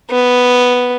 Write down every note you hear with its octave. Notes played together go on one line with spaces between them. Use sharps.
B3